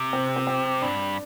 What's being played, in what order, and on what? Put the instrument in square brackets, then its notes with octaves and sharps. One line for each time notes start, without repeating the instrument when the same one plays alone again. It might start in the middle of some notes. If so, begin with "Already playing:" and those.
Already playing: [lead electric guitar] C3
[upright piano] C4
C4
C4
[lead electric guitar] G2 [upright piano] D4